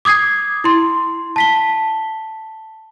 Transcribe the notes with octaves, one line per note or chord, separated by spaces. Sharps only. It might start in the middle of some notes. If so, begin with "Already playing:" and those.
D6 D#6 G#6 C7
E4 C6
A5 B6 G7